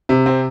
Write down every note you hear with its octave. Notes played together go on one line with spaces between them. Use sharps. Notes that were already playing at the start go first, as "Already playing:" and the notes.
C3
C4